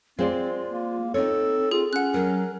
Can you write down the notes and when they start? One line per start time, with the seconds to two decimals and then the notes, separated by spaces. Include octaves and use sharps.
0.19 G#3 C4 F4 C5 D5 F5
0.67 A#3
1.14 C4 D#4 A4 C#5
1.71 F4 G#4
1.93 C#4 F#5 F#6
2.14 F#3 A#4